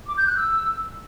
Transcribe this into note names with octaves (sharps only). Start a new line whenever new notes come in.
D6
G6
F#6
E6